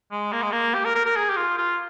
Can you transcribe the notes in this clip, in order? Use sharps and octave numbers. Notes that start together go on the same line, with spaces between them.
G#3
A#3
G#3
A#3
G4
A#4
A#4
A#4
G#4
G4
F4
F4